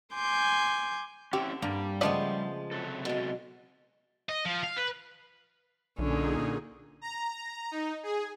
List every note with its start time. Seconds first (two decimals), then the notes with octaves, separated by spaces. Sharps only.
0.14 G#5 C6 D6 G6
1.33 D3 C4 C#4 E4 G4
1.62 G2 G3 A#3
2.01 C#3 F3 G#3 A3 B3 B4 D5 D#5
2.71 C3 F#3 A4
3.05 B2 G#3
4.29 D#5
4.45 F3
4.63 F5
4.77 B4
5.99 B1 A#2 D3 C#4 D#4 G#4
7.01 A#5
7.71 D#4
8.03 G#4